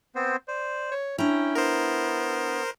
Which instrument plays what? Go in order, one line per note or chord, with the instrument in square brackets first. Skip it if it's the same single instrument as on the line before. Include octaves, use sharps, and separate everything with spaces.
[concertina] B3 C4 C5
[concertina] C5 [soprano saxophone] D5
[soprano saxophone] C#5
[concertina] C#4 G5 [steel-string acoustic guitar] D4 A#5 [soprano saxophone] E4
[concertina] B3 [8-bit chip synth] A#4 C5